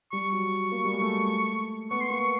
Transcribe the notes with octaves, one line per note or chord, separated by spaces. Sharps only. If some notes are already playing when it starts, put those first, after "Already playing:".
G3 C#6
F#3
A#3
G3
G#3
A3
B3 C#6
C6
A#3 C#6